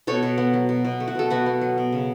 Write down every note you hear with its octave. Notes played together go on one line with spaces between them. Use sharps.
B2 A4 C#5
B2
B3
F#3
B2
B2
A3
F#4
B2 A4
B2 F#4 B4
B3
F#3
B2
C#3